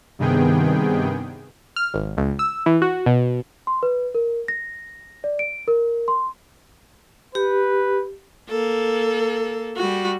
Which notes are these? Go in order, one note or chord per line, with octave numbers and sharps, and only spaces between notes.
G2 C3 D#3 B3 G#4 G5
F6
G#1
C#2
E6
E3
F#4
B2
C6
B4
A#4
A#6
D5
D7
A#4
C6
G4 B4
A#3 A4
G3 F#4